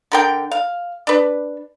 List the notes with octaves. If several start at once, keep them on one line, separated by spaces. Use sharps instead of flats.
D3 A#4 G5
F5
D4 B4